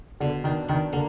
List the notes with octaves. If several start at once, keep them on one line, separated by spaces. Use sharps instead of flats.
B2 D3
D#3 D4
D#3 D4
D3 A#3